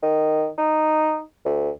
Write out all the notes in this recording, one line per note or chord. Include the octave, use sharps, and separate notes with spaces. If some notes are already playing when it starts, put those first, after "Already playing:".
D#3
D#4
D2